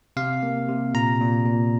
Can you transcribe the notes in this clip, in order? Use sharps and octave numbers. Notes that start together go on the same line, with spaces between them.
C3 F5
A#3
C3
A#2 A#5
A#2
A#2